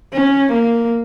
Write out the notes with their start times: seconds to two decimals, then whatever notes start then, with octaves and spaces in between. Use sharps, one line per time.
0.13 C#4
0.52 A#3